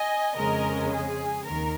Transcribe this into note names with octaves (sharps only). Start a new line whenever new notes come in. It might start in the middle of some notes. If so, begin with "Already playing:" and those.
Already playing: D#5 G#5
F2 C#3 G#3 C#4 A#4 D#5
G#4
D#2 D#3 A#4